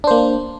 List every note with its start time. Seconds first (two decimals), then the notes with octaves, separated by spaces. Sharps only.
0.04 D4
0.07 C5
0.11 A#3